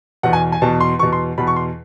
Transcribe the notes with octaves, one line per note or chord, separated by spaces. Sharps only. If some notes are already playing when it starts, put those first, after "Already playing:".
E2 B2 F#5
G#5
G#5
E2 B2 A5
C6
E2 B2 C#6
C6
E2 B2 B5
C#6
C6